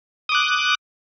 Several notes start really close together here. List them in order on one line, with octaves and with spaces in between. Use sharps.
D#6 D6 F#6